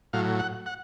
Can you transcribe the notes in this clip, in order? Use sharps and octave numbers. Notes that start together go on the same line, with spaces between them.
A2 F#3 F5
F#5
F#5